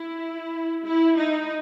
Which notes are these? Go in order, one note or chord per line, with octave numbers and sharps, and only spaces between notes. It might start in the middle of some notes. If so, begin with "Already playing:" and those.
Already playing: E4
E4
D#4